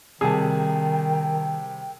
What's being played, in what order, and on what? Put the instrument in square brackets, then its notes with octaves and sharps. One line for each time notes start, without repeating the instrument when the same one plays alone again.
[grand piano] C3 G3 A5 [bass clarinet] D#3 [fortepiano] G#4 [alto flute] G5